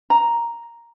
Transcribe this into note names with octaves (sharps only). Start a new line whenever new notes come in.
A#5